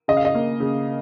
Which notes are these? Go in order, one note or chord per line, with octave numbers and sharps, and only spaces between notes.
C#3 D#5
F5
D#5
A#3
C#3